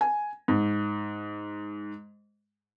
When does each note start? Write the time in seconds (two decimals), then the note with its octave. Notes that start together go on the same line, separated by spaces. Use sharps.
0.01 G#5
0.48 G#2